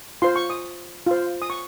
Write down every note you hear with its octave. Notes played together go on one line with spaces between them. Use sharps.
F4 C5 C6
C#6
D#6
F4 C5
D#6
C#6